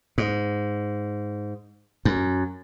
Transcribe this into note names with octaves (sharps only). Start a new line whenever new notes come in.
G#2
F#2